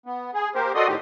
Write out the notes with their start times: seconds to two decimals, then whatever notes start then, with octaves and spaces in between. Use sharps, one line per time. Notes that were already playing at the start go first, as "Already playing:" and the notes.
0.06 B3
0.34 G#4
0.55 A#3 G4 A#4 C5
0.75 F#4 A4 D5 D#5 C6 D#6
0.87 A2 D#3 C4 G4